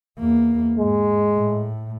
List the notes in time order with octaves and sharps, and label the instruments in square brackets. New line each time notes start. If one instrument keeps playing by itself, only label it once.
[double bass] E2 A#3
[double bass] G#2 [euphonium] G#3
[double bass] A2